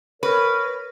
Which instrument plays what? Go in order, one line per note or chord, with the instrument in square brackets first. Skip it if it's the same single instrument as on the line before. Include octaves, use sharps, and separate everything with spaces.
[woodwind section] A#4 C#5 [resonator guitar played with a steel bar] B4